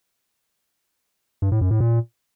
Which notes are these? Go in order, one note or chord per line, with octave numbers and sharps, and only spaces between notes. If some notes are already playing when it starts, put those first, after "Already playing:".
G2
A2
F#2
A2
A#2